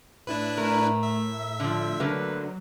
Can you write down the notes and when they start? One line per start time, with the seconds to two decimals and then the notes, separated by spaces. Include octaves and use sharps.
0.27 A2 D4 E4 B4
0.57 A3 A#4
1.03 E5
1.60 D3 F3
2.00 D3 F#3 A3 A#3 B4